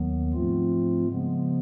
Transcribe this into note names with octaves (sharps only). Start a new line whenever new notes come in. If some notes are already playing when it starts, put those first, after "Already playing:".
Already playing: D#2 D#3 F#3 B3
G#2 F3 A3 C4 F4
C#3 F3 G#3 B3